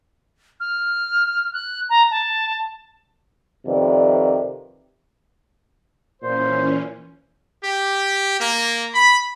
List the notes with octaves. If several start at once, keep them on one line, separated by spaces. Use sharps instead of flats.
F6
F#6
A#5
A5
F2 C3 D#3 B4 D5
A#2 E3 C#4 C5
G4
A#3
B5